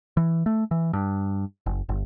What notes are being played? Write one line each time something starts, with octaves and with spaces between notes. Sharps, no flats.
E3
A3
E3
G2
F#1
G1